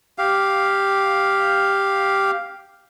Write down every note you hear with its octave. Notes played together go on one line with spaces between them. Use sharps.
G4 F5